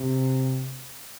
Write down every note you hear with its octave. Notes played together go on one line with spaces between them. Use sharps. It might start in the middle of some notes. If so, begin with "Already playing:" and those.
Already playing: C3